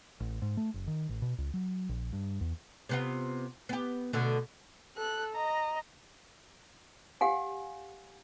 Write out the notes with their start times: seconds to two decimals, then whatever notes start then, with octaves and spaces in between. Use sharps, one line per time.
0.20 A1
0.42 G#2
0.57 A3
0.74 F#1
0.87 D#3
1.09 A1
1.22 B2
1.38 C#2
1.54 F#3
1.89 A#1
2.12 G2
2.41 E2
2.89 C3 B3 F4
3.69 B3 G4
4.13 B2 D3 A3
4.97 A4 F#6
5.34 D#5 A#5
7.21 G4 F5 F#5 G#5